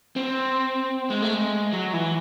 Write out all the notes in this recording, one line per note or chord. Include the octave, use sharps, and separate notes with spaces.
C4
G#3
A3
G#3
F#3
E3